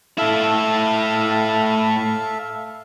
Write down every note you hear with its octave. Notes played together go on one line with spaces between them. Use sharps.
A2 E4 A4 E5 F5